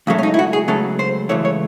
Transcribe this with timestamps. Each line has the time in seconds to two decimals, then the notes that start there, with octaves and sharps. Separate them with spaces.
0.07 C#2 C#3 F#3 A3
0.18 C#4
0.23 D#4
0.34 E4
0.39 F#4
0.53 G#4
0.68 C#2 C#3 F#3 A3 A4
0.99 C5
1.29 C#2 C#3 E3 A3 C#5
1.45 C#5